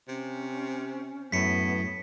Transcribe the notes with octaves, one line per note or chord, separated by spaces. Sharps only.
C3 C#4
F#2 A2 B3 B6 C#7